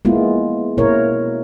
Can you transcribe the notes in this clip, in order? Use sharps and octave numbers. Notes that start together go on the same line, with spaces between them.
G#3 A#3 B3 E4 F4
B2 A#3 E4 A#4 C#5